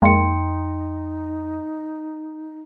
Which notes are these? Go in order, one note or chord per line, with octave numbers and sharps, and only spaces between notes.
F2 G#3 A#3 D#4 G5 C6 C#7